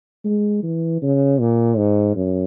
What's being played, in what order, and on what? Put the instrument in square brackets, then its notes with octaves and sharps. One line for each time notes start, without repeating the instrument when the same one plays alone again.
[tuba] G#3
E3
C#3
A#2
G#2
F#2